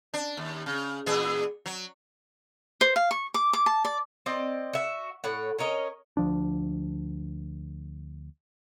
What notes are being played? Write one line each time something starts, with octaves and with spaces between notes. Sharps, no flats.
D4
D#2
C#3
A#2 E3 G#4
F#3
C5
F5
C#6
D6
D6
A5
D5
C4 D5 D#5
F#4 E5
A2 C#5 F#5
C#4 A#4 C#5 D#5
D2 F3 D4